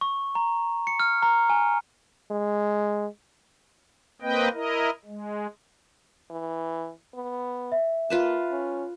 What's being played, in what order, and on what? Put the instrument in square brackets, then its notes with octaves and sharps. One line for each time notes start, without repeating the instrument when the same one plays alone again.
[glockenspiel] C#6
A#5
C#7
F6
A#5
G#5
[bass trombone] G#3
[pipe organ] A#3 C4 B4 D#5 G5
E4 A#4 D#5
G#3
[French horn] E3
B3
[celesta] E5
[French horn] A#3 [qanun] F4 B4 A5
[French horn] C#4